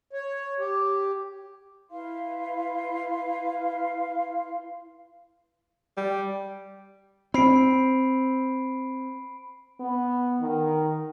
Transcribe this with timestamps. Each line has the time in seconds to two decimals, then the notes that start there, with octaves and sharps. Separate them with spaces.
0.13 C#5
0.60 G4
1.90 E4 B4 F5 C6
5.97 G3
7.34 C4 B5 C7 D7
9.80 B3
10.40 D#3